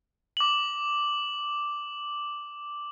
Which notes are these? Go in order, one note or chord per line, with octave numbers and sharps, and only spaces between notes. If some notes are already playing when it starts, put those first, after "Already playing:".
D6 F#7